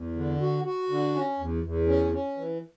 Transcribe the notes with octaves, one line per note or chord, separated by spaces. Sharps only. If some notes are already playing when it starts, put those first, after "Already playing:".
Already playing: E2
D3
F#4
F#4
D3
C#4
E2
E2
C#4
C#4
E3